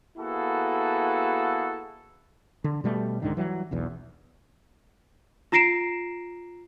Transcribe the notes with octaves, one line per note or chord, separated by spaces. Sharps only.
A#3 B3 E4 F#4 G#4 A4
D3
B2 G3 A3
C#2 G#2 D3 D#3
E3 F#3 G3
E1 B1 E2
F4 A#5 A#6 C7 D7 E7